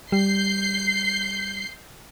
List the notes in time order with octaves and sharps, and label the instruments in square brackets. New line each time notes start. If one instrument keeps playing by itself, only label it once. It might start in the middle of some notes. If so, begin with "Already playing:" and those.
[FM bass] G3 [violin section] G6 C7